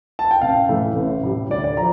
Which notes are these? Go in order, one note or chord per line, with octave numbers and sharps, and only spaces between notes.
A5
G5
A1 F5
A2 E3 A3
A1
A2 G3
D2 D5
D5
F3 A#5